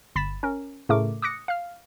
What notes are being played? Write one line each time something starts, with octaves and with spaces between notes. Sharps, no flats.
G1 B5 A6 B6 E7
C#4 A#4
A2 C#3 A3 A#4 D6
D6 D#6 F#6 A#6 C#7
F5 F6